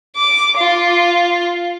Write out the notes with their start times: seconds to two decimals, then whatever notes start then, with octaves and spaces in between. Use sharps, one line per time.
0.17 D6
0.57 F4